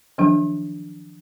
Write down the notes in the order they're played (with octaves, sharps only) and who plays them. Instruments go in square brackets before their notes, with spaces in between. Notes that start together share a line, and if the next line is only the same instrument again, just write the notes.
[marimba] D#3 F3 F#3 D4